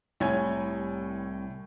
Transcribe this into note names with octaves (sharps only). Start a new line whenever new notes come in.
C2 A2 C#5 G#5